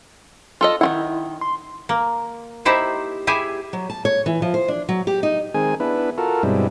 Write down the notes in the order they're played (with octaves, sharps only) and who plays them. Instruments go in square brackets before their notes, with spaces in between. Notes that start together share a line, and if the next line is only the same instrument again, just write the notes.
[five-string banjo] F4 A4 D#5
[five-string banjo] D#3 F4 F#5 [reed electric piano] E4
[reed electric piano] C6
[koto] A#3
D#4 E4 G4 C5 E5
E4 G4 G#4 E5 G#5
[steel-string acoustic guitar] F#3
A5
C#5
E3
F3
C5
D4
F#3
G4
D#4
[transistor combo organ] D#3 G#3 C4 G#4 G#5
B3 D4 E4 B4
F4 F#4 A4 A#4
G2 B2 G3 G#3 C4 E4